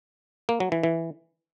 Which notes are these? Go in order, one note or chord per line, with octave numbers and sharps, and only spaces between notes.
A#3
F#3
E3
E3